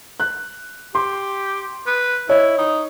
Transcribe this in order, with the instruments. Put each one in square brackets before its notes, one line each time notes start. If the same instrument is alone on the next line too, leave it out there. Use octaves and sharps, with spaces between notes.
[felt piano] F#6
[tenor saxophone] G4 [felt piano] C6
[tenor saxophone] B4
[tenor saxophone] E4 [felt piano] C#5 D#5
[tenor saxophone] D#4